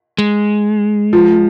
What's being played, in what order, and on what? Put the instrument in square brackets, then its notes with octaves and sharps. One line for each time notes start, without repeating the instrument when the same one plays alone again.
[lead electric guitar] G#3
[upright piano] F3